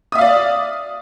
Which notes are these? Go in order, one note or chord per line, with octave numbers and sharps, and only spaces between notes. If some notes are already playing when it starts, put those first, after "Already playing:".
D5 E5 F5 D#6